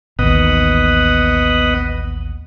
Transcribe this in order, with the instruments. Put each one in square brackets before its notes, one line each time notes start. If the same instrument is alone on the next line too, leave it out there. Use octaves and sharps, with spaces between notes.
[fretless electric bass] A1 D#2 [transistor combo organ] B3 D#5 F#5